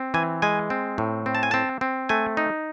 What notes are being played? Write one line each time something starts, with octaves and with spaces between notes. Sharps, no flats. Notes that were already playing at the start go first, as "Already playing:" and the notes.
Already playing: C4
E3 G#5
G#3 G#5
C4
A2
C4
A5
G#5
C4 A5
C4
A3 G#5
D#4